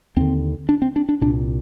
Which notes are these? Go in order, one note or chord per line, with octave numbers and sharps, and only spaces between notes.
D#2 D3 C4
D4
C4
D4
D4
C2 A#2 D4